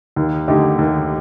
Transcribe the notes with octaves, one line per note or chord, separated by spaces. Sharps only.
D#2
D3 A3 D#4 G4
D#2